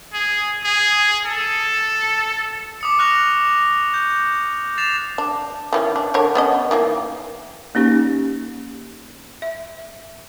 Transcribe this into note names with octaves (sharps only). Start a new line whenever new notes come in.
G#4
G#4
A4
D6 D#6 C#7
C#6 F6 F#6 A#6 F7
G6
A6 C7 E7 F7
D4
D#3 E3 C#4
D4
D3 A#4 C#5
B3 C#4 D#5
D#3 E3 A#3
A#3 C#4 D#4 G4
E5